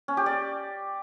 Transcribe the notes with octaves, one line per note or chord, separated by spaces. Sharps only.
C#4
G4
D5